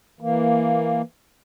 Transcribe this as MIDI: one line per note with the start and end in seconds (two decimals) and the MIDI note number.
0.21 1.02 52
0.21 1.02 58